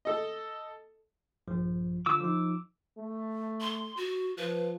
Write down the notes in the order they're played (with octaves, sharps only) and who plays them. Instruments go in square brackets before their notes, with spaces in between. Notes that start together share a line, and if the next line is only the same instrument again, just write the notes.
[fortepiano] A4 D#5
[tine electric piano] A#1 G2 F3
[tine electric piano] D3 F4 [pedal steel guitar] D6 E6
[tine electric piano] F3 D#4
[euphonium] A3
[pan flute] C6
F#4
[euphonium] F3 [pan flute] B4